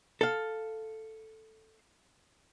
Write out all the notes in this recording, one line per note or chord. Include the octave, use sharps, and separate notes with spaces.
A4 F5